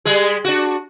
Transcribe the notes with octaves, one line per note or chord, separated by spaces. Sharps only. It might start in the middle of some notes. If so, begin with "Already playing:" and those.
G3 G#3 G#4
D4 F#4